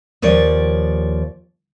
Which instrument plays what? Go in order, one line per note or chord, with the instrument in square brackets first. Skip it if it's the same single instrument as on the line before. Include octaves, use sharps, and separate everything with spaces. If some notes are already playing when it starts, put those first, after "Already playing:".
[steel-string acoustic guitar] D#2 F3 C#5 D5